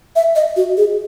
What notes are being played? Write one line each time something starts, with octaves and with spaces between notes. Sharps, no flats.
E5
D#5
F#4
G#4